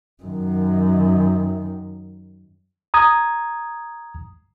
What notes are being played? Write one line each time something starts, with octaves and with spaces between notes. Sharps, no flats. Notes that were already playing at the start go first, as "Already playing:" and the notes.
F#2 D#3
A#5 D#6 G#6